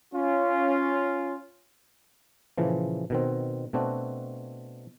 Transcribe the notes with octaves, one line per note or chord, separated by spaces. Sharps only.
C#4 F4
A#2 C#3 E3 F3
B2 D#3 C4
B2 A3 C4 D4 F#4